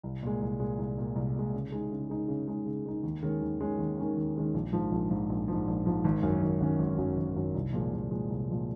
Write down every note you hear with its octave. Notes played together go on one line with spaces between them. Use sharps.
C2
A#2 G#3
C2
A#2 G#3
C2
A#2 G#3
C2
A#2 G#3
C#3
G#3 D#4
C#3
G#3 D#4
C#3
G#3 D#4
C#3
G#3 D#4
D#2
D#3 G#3 C#4
D#2
D#3 G#3 C#4
D#2
D#3 G#3 C#4
D#2
D#3 G#3 C#4
A#1
G#2 F3
A#1
G#2 F3
A#1
G#2 F3
A#1
G#2 F3
G#1
F#2 D#3 F#3 C#4
G#1
F#2 D#3 F#3 C#4
G#1
F#2 D#3 F#3 C#4
G#1
F#2 D#3 F#3 C#4
C2
A#2 F3 G#3
C2
A#2 F3 G#3
C2
A#2 F3 G#3